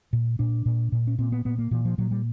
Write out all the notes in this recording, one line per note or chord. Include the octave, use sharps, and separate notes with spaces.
A#2
A#2 D4
A#2
A#2
C#4
A#2 C4
B3
A#2 B3
A#3
A#2 E3
F3
A#2 F#3
G3